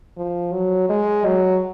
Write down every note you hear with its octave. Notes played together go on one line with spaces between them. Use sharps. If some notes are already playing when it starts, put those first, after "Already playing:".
F3
F#3
G#3
F#3